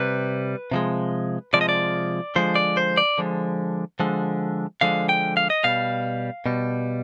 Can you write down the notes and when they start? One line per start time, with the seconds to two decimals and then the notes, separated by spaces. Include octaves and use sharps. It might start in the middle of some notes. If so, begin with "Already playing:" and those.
Already playing: C3 G3 B4
0.71 C3 F3 G#3
1.53 C3 F3 G#3 D5
1.61 D#5
1.69 D5
2.36 D3 F3 G#3 C5
2.56 D5
2.77 C5
2.97 D5
3.18 D3 F3 G#3
3.99 D3 F3 G#3
4.81 D3 F3 G#3 F5
5.09 G5
5.37 F5
5.50 D#5
5.64 B2 G3 F5
6.46 B2 G3